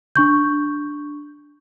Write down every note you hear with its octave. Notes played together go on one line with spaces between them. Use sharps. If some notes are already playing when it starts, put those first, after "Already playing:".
D4 C#6 G6